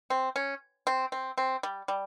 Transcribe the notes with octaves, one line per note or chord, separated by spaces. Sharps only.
C4
C#4
C4
C4
C4
G3
G3